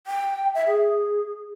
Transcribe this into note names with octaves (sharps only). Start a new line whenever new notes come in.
G5
E5
G#4